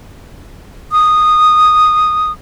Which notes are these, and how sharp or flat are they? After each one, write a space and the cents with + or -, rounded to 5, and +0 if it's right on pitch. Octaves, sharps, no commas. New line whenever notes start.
D#6 -10